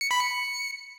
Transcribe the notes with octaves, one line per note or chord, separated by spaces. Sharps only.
C#7
B5
C#7